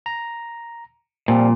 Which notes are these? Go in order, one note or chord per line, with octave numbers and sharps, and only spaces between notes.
A#5
A#2 F3 G3 C4